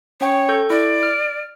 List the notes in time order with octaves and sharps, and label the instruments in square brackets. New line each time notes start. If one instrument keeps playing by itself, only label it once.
[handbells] C#4 G5 [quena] C#5
[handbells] A4 C#6 G6
[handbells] E4 [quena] D5
[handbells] F6